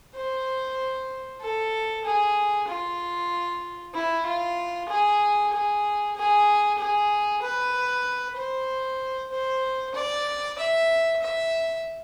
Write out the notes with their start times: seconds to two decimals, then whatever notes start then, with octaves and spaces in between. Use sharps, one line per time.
0.15 C5
1.42 A4
2.05 G#4
2.68 F4
3.95 E4
4.26 F4
4.89 G#4
5.52 G#4
6.16 G#4
6.78 G#4
7.42 B4
8.37 C5
9.32 C5
9.95 D5
10.59 E5
11.22 E5